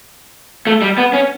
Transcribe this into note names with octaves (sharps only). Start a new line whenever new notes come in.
A3
G3
B3
C#4